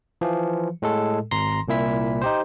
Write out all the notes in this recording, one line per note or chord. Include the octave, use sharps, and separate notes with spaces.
E3 F3
A2 G#3 A4
G#1 A#5 C6 A#6
C2 A#2 E4 B6
D#4 G4 C5